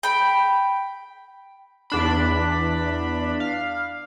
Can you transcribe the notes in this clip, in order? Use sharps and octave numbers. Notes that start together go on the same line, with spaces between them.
G5 B5
E2 D4 B5
F5